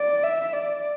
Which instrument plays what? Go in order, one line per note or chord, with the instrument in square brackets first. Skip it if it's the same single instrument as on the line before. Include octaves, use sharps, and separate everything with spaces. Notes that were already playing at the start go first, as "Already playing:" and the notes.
Already playing: [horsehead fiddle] D5
E5
D5